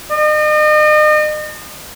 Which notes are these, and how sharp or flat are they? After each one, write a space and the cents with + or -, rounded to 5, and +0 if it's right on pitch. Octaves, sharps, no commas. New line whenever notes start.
D#5 -40